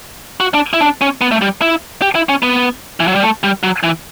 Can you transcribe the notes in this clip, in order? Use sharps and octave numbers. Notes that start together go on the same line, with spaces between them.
F#4
D4
E4
D4
C#4
B3
A3
G3
E4
G4
E4
C#4
B3
E3
F#3
G3
A3
G3
F#3
E3